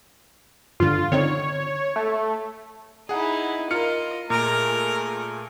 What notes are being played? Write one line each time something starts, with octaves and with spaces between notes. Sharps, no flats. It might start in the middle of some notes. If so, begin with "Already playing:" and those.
G2 D3 F4
D3 C4 D#4 C#5
A3
D#4 E4 G#4 F#5
F4 A#4 D#5 F6 C#7
A#2 A3 G#4 A#4 D7